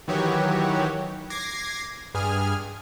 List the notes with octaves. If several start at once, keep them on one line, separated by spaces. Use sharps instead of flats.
D#3 E3 F#3 F#4 G4 C#5
D6 G#6 A#6 C7
G2 G#4 G#5 F6